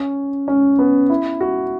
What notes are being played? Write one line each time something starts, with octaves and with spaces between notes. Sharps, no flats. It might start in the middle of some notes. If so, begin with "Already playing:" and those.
Already playing: C#4
C#4
B3
E4
F#4